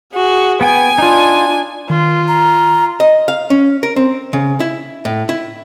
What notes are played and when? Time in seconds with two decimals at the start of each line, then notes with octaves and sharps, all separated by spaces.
0.14 F#4 G#4
0.61 B3 G5 G#5
0.98 D4 D#4 F4
1.90 D#3 F4
2.28 A#5
3.00 D#5
3.28 F5
3.50 C#4
3.83 A#4
3.96 C4
4.33 C#3
4.60 E4
5.05 A2
5.29 E4